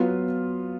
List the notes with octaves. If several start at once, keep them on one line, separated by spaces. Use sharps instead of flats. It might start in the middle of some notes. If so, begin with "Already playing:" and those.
Already playing: F#3 B3 F4